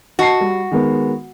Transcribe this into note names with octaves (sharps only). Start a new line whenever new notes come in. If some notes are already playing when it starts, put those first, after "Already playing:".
F#4 D#5 A5 C7
G3
D#3 G#3 B3